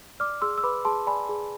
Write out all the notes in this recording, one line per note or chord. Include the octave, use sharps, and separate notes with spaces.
D5 D6 F6
G#4 C6 E6
E6
B4 B5 D6
G#4 A5 C6
D5 G#5 B5
G#4